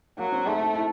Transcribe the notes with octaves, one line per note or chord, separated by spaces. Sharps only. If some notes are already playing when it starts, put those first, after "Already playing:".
F#3 A#3
C4
A3 D#4
D#4
E4